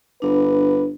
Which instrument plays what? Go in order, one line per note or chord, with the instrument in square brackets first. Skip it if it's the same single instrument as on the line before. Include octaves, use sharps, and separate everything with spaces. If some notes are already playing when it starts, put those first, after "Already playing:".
[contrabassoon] G1 [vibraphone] D4 [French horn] B4